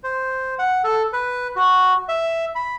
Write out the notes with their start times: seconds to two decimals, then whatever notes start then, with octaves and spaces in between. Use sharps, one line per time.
0.04 C5
0.59 F#5
0.84 A4
1.13 B4
1.56 F#4
2.09 E5
2.55 B5